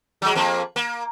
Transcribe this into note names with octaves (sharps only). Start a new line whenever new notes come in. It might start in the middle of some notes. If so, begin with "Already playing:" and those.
F#3 G#3
F2 A#3
A#3